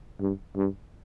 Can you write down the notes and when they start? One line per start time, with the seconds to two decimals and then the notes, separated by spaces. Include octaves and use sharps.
0.21 G2
0.56 G2